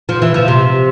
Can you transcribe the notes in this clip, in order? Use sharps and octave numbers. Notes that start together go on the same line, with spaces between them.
F3
E3
F3
C3